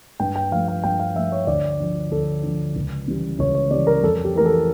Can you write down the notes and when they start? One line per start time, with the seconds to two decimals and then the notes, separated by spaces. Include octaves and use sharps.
0.20 G2 G5
0.36 G5
0.52 F3 A3 F5
0.68 F5
0.84 G2 G5
1.00 F5
1.15 F3 A3 E5
1.32 C#5
1.47 D2 D5
1.80 D3 F3
2.11 D2 A4
2.43 D3 F3
2.76 C#2
3.08 C#3 E3 G3
3.39 C#2 C#5
3.55 C#5
3.71 C#3 E3 G3 D5
3.87 A#4
4.03 F2 A4
4.24 G4
4.35 E3 A3 A#4
4.45 A4